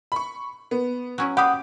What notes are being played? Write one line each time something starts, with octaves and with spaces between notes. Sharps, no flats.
B5 C#6
B3
F#3 C#4 E4
G4 F5 F#5 B5 D6 D#6